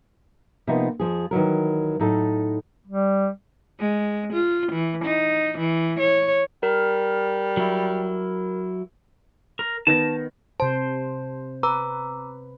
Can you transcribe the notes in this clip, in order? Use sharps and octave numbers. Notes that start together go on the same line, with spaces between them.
C3 F3 A#3 B3 D#4
F2 F3 G#4
D#3 E3 F#3 A#4
A2 F#3 D#4 A4
G3
G#3
F4
E3
D#4
E3
C#5
G3 A#4
F#3 E4
A#4
D#3 B3 A5 A#6
C3 C5 A5
B4 A#5 D6 E6